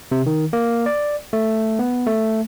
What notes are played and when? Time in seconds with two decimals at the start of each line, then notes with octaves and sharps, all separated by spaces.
0.12 C3
0.26 D#3
0.53 A#3
0.86 D5
1.33 A3
1.79 B3
2.07 A3